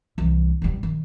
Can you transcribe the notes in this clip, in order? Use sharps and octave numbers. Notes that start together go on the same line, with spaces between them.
C2 E3
B2 G3
D#3